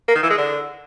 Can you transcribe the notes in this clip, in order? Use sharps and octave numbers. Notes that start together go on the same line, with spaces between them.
A#3
D#3
E3
G#3
D3